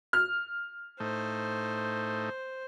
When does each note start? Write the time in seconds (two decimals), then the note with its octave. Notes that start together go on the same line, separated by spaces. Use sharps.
0.13 F6
1.00 A2 A3 D#4 C5